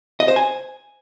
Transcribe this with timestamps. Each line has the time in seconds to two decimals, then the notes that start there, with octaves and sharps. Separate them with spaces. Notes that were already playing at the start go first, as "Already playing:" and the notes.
0.20 D#5
0.28 C5
0.36 G#5